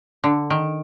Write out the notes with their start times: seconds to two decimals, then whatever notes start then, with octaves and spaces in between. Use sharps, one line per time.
0.24 D3
0.50 D#3